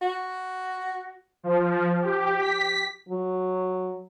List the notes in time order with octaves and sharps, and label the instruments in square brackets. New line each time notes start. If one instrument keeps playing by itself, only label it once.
[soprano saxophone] F#4
[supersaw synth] F3
G4
B6
[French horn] F#3